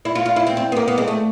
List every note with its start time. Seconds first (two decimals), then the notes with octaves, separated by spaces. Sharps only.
0.05 E4
0.15 F4
0.26 F4
0.36 E4
0.47 C4
0.57 C4
0.72 B3
0.76 A#3
0.88 B3
0.98 G#3
1.08 A3